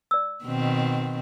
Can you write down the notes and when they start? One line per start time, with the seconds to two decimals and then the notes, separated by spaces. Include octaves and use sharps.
0.11 D5 E6
0.45 B2 D#3 C4